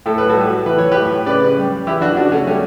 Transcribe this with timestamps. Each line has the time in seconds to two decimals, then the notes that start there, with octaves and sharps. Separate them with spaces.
0.06 A2 A4
0.18 B4
0.29 F#4 A4
0.36 G3
0.66 E3 B4
0.78 C#5
0.92 G4 B4
0.97 A2
1.26 C#3 B4 D5
1.57 G3
1.87 E3 E4 G4
2.01 D4 F#4
2.17 C#3 D4 F#4
2.32 A3 C#4
2.47 G3 A3 C#4